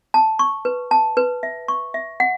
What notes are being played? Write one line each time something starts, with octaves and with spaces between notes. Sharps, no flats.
A5
C#6
B4
A5
B4
E5
C#6
E5
F#5